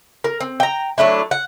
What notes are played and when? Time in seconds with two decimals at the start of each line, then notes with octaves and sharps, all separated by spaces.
0.24 A#4
0.41 C4
0.60 G5 A#5
0.98 F#3 A3 D4 E4
1.31 F#5